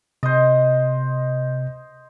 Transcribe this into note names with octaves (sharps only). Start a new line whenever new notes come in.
C3 C5 D#5